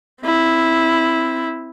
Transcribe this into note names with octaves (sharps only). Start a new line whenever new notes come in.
C4 E4